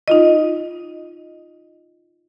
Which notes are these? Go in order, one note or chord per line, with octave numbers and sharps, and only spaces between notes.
D#4 F4 D#5